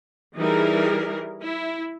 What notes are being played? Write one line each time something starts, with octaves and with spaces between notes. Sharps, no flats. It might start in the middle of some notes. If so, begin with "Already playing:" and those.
E3 G3 D#4 E4 G#4 A#4
E4